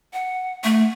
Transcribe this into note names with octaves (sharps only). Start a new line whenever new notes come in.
F#5
A3